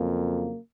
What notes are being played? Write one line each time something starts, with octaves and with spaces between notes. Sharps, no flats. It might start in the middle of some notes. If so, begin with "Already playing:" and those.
Already playing: F2 C#3 F#3 A#3